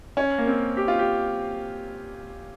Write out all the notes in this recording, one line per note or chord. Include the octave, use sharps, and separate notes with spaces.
C#4
A#3
C4
G4
F4
G4